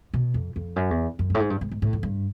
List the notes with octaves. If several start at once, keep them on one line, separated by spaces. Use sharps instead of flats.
B2
F2
F2
F#2
E2
F#2
G2
A2
G#2
G2
G#2
G#2
A2
F2
G2